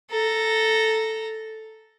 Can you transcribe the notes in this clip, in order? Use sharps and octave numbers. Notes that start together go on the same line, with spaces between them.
A4 A#5